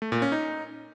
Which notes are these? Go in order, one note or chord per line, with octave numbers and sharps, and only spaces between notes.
A3
A#2
C#4
D#4